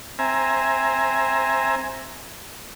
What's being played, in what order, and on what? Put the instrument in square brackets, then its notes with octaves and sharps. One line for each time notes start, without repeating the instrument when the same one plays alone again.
[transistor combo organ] C4 E5 G#5 A#5